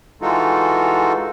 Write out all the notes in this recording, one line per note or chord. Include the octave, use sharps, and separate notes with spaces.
E3 G#3 D#4 F4 F#4 A4